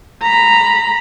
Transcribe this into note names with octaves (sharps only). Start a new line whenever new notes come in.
A#5 B5